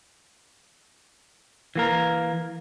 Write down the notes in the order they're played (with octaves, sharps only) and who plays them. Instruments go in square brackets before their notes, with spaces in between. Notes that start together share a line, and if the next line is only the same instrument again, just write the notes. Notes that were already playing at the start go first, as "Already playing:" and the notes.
[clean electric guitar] E3 A#3 A#4